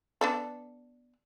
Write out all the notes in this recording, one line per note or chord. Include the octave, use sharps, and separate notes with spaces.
B3 D4 A4